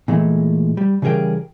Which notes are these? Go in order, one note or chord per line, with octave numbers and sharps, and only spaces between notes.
A#2 E3 G#3 A3
G3
C#3 E3 G3 G#4 A#4 G5